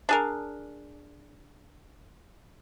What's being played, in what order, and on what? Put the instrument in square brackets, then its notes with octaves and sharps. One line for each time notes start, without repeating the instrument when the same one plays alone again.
[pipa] D4 G#4 A#4